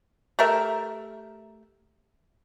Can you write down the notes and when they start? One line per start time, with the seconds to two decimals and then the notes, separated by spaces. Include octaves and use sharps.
0.39 A3 G4 A#4 E5